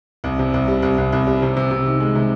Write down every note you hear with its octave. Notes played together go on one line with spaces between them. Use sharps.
C2
C3
C2
G3
C2
C2
C2
G3
C3
C3
C3
D#3
G#3
C3